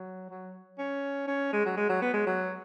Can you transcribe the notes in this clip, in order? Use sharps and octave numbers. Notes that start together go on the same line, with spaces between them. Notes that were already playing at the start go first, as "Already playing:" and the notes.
Already playing: F#3
F#3
C#4
C#4
G#3
F#3
G#3
F#3
B3
G#3
F#3